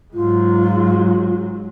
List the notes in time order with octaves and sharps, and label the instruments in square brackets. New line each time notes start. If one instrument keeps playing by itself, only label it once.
[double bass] G#2 F#3 [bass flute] F4